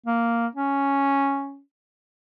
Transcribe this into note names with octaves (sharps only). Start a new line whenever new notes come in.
A#3
C#4